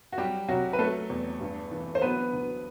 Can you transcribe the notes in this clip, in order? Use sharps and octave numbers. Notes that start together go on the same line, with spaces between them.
F#4
F#3 G3 G4
C2 F#3 F#4
B4
F#3 A3 A4
E2
G2
E3
C5
F#3 B3 B4
D2